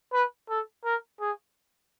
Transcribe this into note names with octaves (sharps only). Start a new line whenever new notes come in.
B4
A4
A#4
G#4